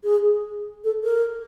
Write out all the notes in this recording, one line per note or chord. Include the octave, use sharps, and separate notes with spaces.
G#4
A4
A#4